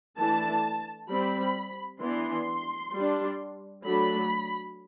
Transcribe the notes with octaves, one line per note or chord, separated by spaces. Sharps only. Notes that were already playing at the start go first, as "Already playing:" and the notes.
E3 A3 D4 A5
G3 C4 B5
E3 B3 D4 C6
G3
D4
F#3 A3 D4 B5